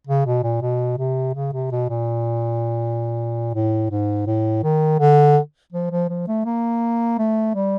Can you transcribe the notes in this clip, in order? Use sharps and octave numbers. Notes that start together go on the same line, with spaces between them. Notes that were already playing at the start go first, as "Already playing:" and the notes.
C#3
B2
A#2
B2
C3
C#3
C3
B2
A#2
A2
G#2
A2
D#3
D3
F3
F3
F3
A3
A#3
A3
G3